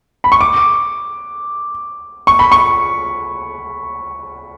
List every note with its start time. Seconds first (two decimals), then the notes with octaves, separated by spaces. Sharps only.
0.24 B5
0.32 C#6
0.41 D6
2.27 C#6
2.39 B5
2.52 C#6